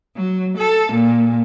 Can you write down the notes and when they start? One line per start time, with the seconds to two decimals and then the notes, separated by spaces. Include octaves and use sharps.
0.16 F#3
0.57 A4
0.92 A#2